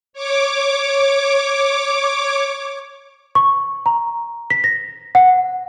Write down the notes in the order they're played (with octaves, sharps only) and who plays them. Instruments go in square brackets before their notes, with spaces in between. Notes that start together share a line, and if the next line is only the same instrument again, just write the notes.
[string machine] C#5 D6
[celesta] C#6
A#5
B6
A#6
F#5